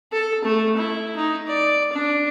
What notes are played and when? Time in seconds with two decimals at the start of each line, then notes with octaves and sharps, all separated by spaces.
0.12 A4
0.44 A3
0.76 E4
1.16 D#4
1.47 D5
1.92 D4